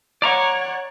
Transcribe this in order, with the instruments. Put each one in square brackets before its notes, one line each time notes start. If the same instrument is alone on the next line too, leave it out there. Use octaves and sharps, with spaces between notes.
[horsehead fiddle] C#5 F#5 [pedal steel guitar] D5 A#5 C#6